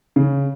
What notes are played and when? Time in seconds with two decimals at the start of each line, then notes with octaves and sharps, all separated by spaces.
0.16 C#3